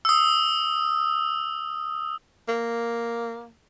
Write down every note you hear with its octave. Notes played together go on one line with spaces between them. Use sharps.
D#6 E6
A#3